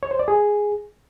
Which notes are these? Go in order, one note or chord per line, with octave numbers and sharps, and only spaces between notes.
C#5
C5
D5
G#4